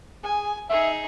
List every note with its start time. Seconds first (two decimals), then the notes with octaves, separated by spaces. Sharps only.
0.24 G#4 G#5
0.70 D#4 G#4 E5